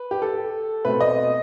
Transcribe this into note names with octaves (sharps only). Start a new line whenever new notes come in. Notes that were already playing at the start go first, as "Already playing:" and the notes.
Already playing: B4
G4
A4
B2 A3 C4 B4
D#5